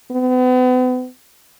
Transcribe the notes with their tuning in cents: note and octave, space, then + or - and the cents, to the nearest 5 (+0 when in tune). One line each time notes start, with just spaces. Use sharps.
B3 +40